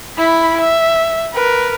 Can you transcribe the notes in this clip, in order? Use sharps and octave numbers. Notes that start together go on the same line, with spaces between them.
E4 B5
E5
A#4 B4